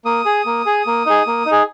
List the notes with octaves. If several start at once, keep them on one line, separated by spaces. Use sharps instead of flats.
A#3 D#6
G#4
A#3
G#4
A#3
D#4 G#4
A#3
D#4
G#4